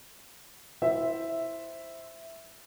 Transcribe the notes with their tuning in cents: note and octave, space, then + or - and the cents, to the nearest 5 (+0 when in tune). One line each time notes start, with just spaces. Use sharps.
E4 +0 C5 +0 E5 +0